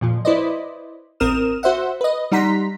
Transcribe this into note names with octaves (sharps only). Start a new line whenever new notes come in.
F2 A#2 F3
E4 B4 C5 D5 D#5
A1 C4 A#4 D#6 F6 E7
F#4 C5 E5 F#5
B4 D#5
G3 D#4 F#5 A#5 C6 B6